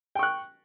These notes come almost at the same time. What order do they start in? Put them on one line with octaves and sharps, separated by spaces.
G5 C#6 F#6